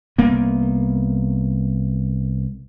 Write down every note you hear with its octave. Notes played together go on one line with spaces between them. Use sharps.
C2 A#3 B3